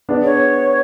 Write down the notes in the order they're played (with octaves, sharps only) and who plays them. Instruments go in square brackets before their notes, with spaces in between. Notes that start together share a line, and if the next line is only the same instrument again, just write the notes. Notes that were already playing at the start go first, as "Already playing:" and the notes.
[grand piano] B3 D4 G#4 D5
[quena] C#5